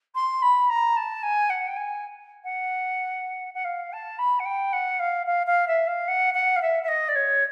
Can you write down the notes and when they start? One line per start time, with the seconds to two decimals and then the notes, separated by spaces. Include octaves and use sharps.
0.15 C6
0.42 B5
0.69 A#5
0.96 A5
1.23 G#5
1.49 F#5
1.67 G5
1.76 G#5
2.44 F#5
3.54 F#5
3.64 F5
3.92 A5
4.18 B5
4.39 F#5
4.45 G5
4.72 F#5
4.99 F5
5.26 F5
5.46 F5
5.67 E5
5.87 F5
6.08 F#5
6.34 F#5
6.56 F5
6.61 E5
6.83 E5
6.88 D#5
7.08 D5
7.15 C#5